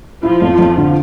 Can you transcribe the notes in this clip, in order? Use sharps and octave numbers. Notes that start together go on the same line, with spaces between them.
F3 E4 F4
F2
F2
D3